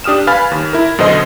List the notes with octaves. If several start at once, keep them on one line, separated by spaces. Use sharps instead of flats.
D4 G4 D#6 F6 E7
B4 F5 G#5 B5 F6 A6
D#2
E4 A#4
F#2 B2 D3 C5 D#5 C6